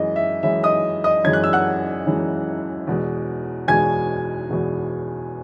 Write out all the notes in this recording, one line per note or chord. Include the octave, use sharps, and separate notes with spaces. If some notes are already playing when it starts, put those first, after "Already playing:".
Already playing: F#2 E3 G#3 D#5
E5
F#2 E3 G#3 E5
D#5 D#6
D#5 D#6
F#2 E3 G#3 G#6
F#6
E6
F#5 F#6
F#2 E3 G#3
E2 B2 G#3
E2 B2 G#3 G#5 G#6
E2 B2 G#3